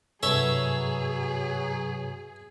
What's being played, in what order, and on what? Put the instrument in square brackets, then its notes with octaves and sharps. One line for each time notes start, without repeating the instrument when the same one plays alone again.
[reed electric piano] G2 C3 B4 [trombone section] F#3 [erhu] G#4 [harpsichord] A4 C#5 E5